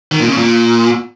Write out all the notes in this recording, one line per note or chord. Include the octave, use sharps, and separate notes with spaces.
D#3
A#2
C#3
A#2